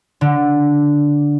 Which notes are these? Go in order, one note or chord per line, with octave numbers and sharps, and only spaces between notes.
D3